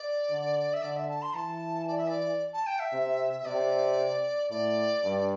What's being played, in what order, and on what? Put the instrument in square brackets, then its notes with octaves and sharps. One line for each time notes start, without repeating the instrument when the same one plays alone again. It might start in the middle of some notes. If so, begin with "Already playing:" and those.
Already playing: [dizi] D5
[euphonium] D3
[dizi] E5
[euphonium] D3 [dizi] D5
[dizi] E5
A5
C6
[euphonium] E3 [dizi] A5
[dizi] D5
E5
D5
A5
G5
E5
[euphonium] C3
[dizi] E5
[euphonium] C3 [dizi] D5
[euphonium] A2 [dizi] D5
[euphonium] G2